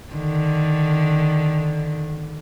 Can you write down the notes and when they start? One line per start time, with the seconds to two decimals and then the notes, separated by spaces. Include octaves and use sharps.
0.13 D3 D#3